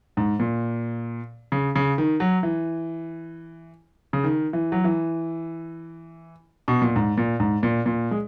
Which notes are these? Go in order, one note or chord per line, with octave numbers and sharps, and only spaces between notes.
G#2
A#2
C#3
C#3
D#3
F#3
E3
C#3
D#3
E3
F#3
E3
B2
A#2
G#2
A#2
G#2
A#2
A#2
G#3